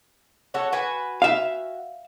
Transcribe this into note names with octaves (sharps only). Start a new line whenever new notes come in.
F#4 A4 C#5
F#4 B4 G#5
E5 F5